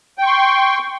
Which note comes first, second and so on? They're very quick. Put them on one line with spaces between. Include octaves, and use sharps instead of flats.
G5 C#6 C6